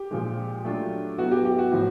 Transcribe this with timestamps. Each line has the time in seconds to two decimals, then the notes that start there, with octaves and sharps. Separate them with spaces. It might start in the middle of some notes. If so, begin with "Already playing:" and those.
Already playing: G4
0.11 A#2 F3 G#3
0.65 F#3 A3 D4 F4
1.18 F#3 B3 E4 F#4
1.32 G4
1.45 G4
1.58 F#4
1.72 A2 F3